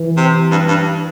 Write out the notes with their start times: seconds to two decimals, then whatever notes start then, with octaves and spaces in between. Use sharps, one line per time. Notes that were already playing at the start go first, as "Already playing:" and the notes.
Already playing: E3
0.17 C3
0.51 G2
0.68 G2